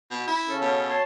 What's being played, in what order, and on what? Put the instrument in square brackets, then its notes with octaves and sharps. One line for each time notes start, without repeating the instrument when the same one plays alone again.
[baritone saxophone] B2
E4
[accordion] C#3 C#4 A4
[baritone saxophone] B2
[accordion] C#5 A5 C6